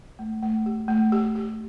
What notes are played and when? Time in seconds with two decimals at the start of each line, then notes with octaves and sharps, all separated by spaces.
0.19 A3
0.42 A3
0.66 G4
0.88 A3
1.12 G4
1.35 G4